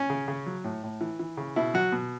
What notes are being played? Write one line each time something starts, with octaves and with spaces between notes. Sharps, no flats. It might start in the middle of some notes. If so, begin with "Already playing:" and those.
Already playing: C#4
C#3
C#3
F#3
A2
A2
E3
E3
C#3
B2 E4
F#3 F#4
B2